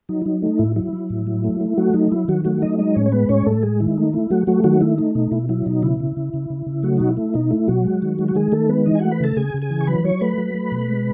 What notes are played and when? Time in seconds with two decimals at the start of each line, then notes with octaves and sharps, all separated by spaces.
0.09 F#3 D#4
0.22 E4
0.26 F#3 D#4
0.42 A3 D#4
0.59 A2 E4
0.76 F#3 E4
0.93 F#3
1.10 A2
1.27 F#3
1.44 A3
1.61 A3
1.77 F#3 A3 F#4
1.94 F#3 D#4
2.11 F#3 E4
2.28 D#3 F#3 F#4
2.45 F#3 A3 F#4
2.62 F#3 D#4 D#5
2.78 G#3 D#4 D#5
2.95 A2 C#4 C#5
3.06 C#5
3.12 G#3 B3 B4
3.29 A2 C#4 C#5
3.46 A2 A3 A4
3.63 G#3 G#4
3.80 D#3 E4
3.97 A3 D#4
4.13 A3 E4
4.30 F#3 A3 F#4
4.47 F#3 A3 F#4
4.64 D#3 F#3 F#4
4.81 A3 E4
4.98 A3 D#4
5.15 B2 D#4
5.31 B2 E4
5.49 F#3 E4
5.66 B2 D#4
5.83 C#3 E4
6.00 C#3
6.17 C#3
6.34 C#3
6.50 C#3
6.66 C#3
6.83 F#3 A3 F#4
6.97 B2 D#4
7.09 E4
7.17 A3
7.34 B2 D#4
7.51 A3 E4
7.68 B2 F#3 F#4
7.85 G#3
8.02 D#3
8.19 G#3
8.28 F#4
8.35 D#3 G#3 G#4
8.52 D#3 A3 A4
8.69 G#3 B3 B4
8.86 E3 D#4 D#5
8.95 G#5
8.99 A3 F#4 F#5
9.11 B4 B5
9.20 C#3 A4 A5
9.37 C#3 G#4 G#5
9.54 C#3
9.62 G#4 G#5
9.70 E3
9.81 C#6
9.87 F#3 B4 B5
10.04 F#3 C#5 C#6
10.21 A3 B4 B5
10.38 F#3
10.54 A3
10.72 B2
10.88 G#3